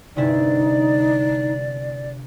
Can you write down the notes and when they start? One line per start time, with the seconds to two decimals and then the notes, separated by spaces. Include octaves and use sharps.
0.16 G1 C3 D#4 E4 D5